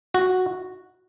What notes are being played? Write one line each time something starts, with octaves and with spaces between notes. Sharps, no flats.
F#4